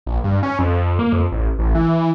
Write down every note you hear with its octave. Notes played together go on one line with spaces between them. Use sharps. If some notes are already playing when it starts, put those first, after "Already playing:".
A#1
G2
C#4
F2
A#3
F2
A1
A1
E3